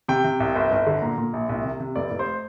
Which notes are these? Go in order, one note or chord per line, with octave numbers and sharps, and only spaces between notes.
C3 G5
C3
C2
G1
G1
D3
A#2 A#5
A#2
A#1
C2
C3
C3
F1 D5
F1
C5